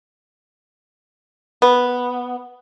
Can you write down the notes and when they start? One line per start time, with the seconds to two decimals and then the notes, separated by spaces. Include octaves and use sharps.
1.62 B3